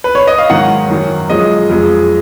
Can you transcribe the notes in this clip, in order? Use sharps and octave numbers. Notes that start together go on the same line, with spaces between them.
B4
C#5
D#5
F5
G#2 D#3 F#3 F#5
F#2 D#3 F#3
F#2 F3 G#3 D#5
F2 F3 G#3